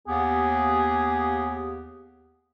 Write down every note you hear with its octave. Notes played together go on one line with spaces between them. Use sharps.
D#2 B3 G4 G#4